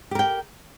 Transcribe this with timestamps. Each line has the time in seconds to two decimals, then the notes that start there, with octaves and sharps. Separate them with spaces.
0.11 G4
0.15 A#4
0.19 G5